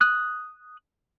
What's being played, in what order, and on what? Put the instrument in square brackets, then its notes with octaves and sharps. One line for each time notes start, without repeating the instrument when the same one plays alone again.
[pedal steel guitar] D#6 F#6